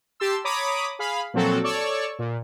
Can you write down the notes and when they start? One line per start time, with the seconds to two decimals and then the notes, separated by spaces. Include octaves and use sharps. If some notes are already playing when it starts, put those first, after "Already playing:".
0.20 G4 A5 C6 E6
0.44 C#5 A#5 B5 D6 D#6
0.99 G#4 F5 B5
1.34 A#2 F3 F#3 C4 F#4 A4
1.63 A4 C#5 D5 C#6 E6
2.19 A#2